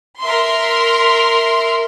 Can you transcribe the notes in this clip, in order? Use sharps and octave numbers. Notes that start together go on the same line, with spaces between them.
A#4 E5 C6